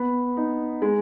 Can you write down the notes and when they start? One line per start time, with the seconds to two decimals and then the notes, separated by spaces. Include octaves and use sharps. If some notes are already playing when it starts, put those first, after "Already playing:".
Already playing: B3
0.37 D#4
0.82 G#3